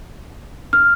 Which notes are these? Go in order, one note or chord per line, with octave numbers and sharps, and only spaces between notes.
F6